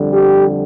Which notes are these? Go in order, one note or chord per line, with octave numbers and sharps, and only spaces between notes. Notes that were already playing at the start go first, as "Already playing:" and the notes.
Already playing: F2 D3 G3
G4